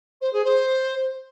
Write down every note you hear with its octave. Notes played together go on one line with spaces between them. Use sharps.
C5
G#4
C5